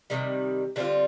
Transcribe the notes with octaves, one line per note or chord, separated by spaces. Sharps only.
C3 D#3 G3
D3 G3 C4 F4